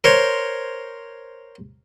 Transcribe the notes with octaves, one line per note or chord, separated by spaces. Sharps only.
A#4 C5 C#5